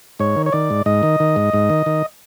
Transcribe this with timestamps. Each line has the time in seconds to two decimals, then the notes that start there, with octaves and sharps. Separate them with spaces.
0.19 G#2 C#5
0.37 D#3
0.46 C#5
0.52 D#3 D5
0.70 G#2
0.86 G#2 D#5
1.03 D#3
1.20 D#3
1.36 G#2
1.54 G#2
1.70 D#3
1.86 D#3